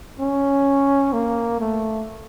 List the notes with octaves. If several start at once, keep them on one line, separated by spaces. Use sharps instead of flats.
C#4
A#3
A3